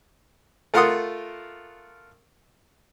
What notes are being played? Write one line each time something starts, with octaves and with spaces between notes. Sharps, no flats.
A3 F4 A#4 F#5 C6 D#6